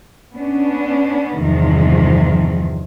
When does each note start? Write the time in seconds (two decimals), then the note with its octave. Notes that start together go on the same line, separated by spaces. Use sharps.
0.35 B3 C#4 D4
1.40 E2 G2 C3 D#3 F3